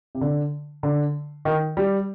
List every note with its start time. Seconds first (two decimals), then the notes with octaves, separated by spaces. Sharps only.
0.15 C3
0.21 D3
0.83 D3
1.45 D#3
1.77 G3